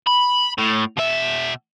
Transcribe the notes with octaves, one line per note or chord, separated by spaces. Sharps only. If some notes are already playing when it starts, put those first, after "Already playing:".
B5
A2
B2 E5